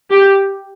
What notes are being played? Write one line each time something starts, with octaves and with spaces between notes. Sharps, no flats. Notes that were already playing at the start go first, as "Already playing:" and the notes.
G4